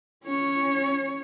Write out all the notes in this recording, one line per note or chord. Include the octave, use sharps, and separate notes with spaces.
C#4 C#5